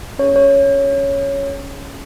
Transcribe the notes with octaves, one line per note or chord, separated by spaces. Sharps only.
C#4 G#4 C#5
C#5